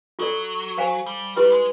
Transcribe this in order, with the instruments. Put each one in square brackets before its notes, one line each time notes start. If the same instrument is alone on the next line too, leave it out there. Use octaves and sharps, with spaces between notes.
[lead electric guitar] F#3 [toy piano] F4 A4 D5
[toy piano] C5 F5 G#5
[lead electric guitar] G3
[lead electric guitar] G3 [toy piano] E4 G4 B4
[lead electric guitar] G#3